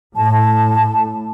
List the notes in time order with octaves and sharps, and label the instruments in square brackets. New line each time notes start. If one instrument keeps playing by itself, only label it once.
[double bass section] A2 [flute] A5